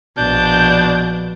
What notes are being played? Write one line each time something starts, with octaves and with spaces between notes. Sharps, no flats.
A#1 B2 F3 D4 G6